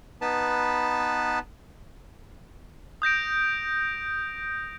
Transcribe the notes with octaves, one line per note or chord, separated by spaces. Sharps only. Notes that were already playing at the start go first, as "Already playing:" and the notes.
B3 D#4 B4 A5
D#6 G6 A#6 D7